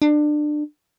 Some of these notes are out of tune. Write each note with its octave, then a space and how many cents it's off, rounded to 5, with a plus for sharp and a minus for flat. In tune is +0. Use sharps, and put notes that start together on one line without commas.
D4 +25